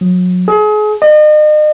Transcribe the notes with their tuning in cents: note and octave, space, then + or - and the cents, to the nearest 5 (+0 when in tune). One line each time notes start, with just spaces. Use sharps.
F#3 -35
G#4 +35
D#5 -40